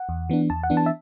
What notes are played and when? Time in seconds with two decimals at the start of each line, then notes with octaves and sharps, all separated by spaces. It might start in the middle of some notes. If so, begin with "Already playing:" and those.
Already playing: F#5
0.09 E2
0.30 E3 B3 D4
0.50 E2 A5
0.63 F#5
0.70 E3 B3 D4
0.77 A5
0.86 E5